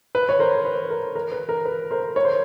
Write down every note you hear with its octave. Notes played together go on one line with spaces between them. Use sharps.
B4
C#5
A#4 C5
B4
A#4
A#4
B4
A#4
B4
A#4 C5
C#5
C5